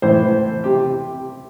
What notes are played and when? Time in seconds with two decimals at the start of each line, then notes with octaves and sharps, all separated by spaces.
0.02 A2 E3 C5
0.64 C3 G4